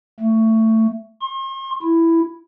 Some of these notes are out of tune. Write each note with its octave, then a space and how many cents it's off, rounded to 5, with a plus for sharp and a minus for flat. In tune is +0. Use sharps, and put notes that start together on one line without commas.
A3 +20
C6 +45
E4 +5